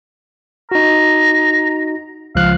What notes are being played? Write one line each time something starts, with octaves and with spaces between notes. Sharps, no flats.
D#4 F#4 A#5
C#2 F3 F5 F#6